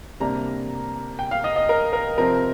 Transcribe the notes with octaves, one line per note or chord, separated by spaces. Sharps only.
C3 G3 A#3 D4 A#5
G5
F5
D#5
D#5
A#4
A#4
C3 F3 C4 A#4